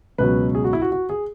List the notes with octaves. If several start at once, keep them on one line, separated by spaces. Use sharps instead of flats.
C#2 B2 F#3 B4
G#4
F#4
E4
F#4
F#4
G#4